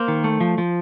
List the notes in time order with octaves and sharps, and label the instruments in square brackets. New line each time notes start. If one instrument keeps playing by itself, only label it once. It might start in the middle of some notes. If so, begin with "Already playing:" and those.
Already playing: [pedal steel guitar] A#3 C5
D#3
A3
F3
F3